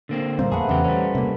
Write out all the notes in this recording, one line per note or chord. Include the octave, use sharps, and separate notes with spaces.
D3 A#3 C4
A#2 G3 A#3 C4 C5
F2 A3 G#4 B4 F#5
E2 C#3 G4 C5
G3 C#4
C3 A#3